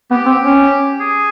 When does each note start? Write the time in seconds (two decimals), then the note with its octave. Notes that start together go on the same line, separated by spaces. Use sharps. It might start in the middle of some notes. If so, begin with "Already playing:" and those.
0.11 B3 G4
0.26 C4
0.40 C#4
1.00 G#4